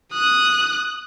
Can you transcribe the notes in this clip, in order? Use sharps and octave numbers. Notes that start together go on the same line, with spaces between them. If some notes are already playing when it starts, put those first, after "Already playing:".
D#6 F#6